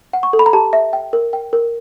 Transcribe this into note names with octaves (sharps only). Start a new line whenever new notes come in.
F#5
C#6
A4
B5
A#5
G4 A5
E5
G5
A#4
G5
A#4